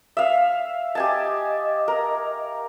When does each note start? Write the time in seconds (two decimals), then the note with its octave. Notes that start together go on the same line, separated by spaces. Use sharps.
0.17 E5 F5
0.95 G4 D#5 G#5 A5
1.88 A#4